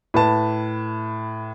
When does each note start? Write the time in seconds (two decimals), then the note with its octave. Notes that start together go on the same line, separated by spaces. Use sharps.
0.14 A2 B4 A5